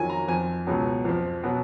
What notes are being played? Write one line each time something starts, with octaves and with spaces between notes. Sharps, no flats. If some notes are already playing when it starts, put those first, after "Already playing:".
Already playing: F2 D#3 F#3 G#5
A#5
F2 F3 G#5
C#2 B2 F#3
F2 F3
B2 F#3